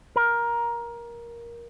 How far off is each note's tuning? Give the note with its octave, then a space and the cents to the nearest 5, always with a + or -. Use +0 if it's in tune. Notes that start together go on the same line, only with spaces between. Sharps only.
A#4 +15